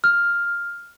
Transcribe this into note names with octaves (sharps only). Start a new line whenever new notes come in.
F6